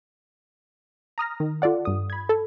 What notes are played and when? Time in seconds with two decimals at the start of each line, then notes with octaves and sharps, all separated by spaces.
1.18 A#5 D#6 F6 A#6
1.40 D#3
1.62 F4 A4 D5 F#5
1.85 G2 D#6
2.10 B5 G#6
2.29 A4